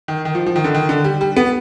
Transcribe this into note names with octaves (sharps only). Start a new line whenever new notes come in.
D#3
D#3
F3
F3
D#3
D3
D#3
D3
G3
G3
B3